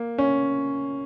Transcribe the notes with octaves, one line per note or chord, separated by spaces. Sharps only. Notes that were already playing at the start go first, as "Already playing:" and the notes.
Already playing: A#3
C#4